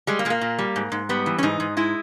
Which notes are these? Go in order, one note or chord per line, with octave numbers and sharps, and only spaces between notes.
G3 G#3
A#3
A#2 G#3
A#3
A#2
G3
G#2
G#2
G3 B3
E3
C#4
G#2 D#4
G#2
G#3 E4